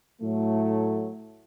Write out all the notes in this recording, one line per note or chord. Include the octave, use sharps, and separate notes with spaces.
A2 F#3 A3